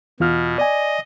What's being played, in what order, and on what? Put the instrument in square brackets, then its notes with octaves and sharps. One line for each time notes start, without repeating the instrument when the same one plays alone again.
[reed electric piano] E2 F4 F6 [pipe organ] B2
[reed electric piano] D5 G#5 [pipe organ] D#5